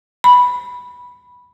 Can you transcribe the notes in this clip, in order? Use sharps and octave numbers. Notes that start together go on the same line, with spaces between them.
B5